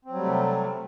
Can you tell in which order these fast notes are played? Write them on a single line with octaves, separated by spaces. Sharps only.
C4 F#3 G3 A3 C3